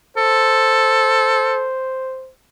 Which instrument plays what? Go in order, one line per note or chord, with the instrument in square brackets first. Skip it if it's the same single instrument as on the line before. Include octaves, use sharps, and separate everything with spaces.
[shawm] A4 [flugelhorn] C5